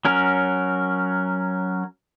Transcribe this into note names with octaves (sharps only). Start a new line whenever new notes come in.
F#3 C#4 A#4